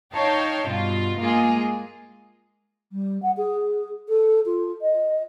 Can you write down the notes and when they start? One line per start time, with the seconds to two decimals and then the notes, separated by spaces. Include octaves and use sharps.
0.14 D#4 C#5 F5 G5 A5
0.70 G2 B2 F4
1.20 G#3 A#3 F4 G#4
2.92 G3
3.22 F#5
3.37 G#4
4.09 A4
4.46 F4
4.82 D#5